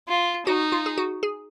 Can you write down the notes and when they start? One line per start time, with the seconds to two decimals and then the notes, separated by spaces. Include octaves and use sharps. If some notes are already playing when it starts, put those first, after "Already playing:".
0.08 F4
0.46 D#4 F#4
0.72 F4
0.86 G#4
0.98 F#4
1.23 G#4